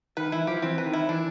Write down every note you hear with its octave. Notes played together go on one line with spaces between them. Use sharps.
D#3 B4
E3 E4
F3 G4
E3 C4
B4
D#3
E4
E3 D4